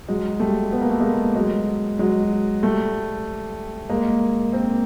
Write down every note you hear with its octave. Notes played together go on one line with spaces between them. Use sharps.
F#3 G#3
G3 A3
B3
A#3
A3
G#3 A#3
F#3 G#3
F#3 G#3
G3 A3
G#3 A#3
A#3 C4